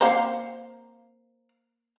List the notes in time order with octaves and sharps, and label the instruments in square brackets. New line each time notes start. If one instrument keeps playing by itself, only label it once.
[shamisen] A#3 C4 C5 [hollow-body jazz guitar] F5 F#5 A#5